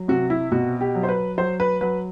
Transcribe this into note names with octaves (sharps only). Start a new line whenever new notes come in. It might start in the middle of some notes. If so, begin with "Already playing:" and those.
Already playing: F#3
C3 F#4
E4
B2 F#4
G4
F#3
C5
B4
F#3 C5
B4
F#3 B4